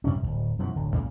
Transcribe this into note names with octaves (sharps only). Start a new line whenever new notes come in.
F#2 C3 C#4
D1 C#2
F#2 B2 E3 F3
D1 D3
C#2 A#2